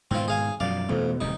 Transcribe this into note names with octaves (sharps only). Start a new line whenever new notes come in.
G#2 B2 D#3 C4 F4
G#4 F5 G#5
F#2 B2 F3 D5 F5
F2 B2 E3 A3
D1 C3 G3 D#4